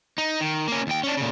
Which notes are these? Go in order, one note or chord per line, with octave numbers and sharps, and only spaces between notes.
D#4
D#3
A#3 C#4
D#2 G5
C#4 D4
A#2 C#3